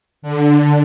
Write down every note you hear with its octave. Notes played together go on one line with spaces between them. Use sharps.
D3